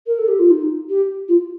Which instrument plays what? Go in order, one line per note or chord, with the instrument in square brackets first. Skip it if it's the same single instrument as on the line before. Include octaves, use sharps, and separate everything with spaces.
[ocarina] A#4
A4
G4
F4
D#4
G4
F4